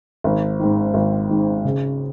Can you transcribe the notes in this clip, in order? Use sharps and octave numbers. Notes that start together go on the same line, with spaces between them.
G#1
G#2 D#3
G#1
G#2 D#3
C#3